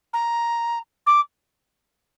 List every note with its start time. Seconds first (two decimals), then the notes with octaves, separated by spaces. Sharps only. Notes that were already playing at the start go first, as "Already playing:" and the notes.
0.13 A#5
1.06 D6